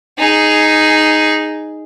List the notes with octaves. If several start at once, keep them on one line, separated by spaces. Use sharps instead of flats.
D#4 G#4